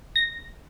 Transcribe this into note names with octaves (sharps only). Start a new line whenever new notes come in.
A#6